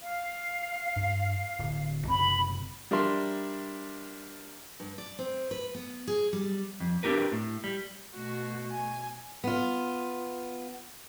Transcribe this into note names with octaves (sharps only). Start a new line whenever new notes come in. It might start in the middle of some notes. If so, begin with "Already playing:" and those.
F5
G2
D1
F#1 C3 C4 B5
G3 D4 A#4 E5 C6
G2
D5
C4
B4
B3
G#4
G3
F2
C4 D4 D#4 G4 A#4 B4
A2
G3
B2 A3 F#4
G#5
B3 F4